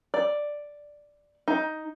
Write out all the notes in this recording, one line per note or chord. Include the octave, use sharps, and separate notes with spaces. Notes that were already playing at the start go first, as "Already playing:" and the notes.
D5
D#4